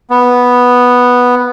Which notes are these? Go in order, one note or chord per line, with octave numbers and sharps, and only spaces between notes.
B3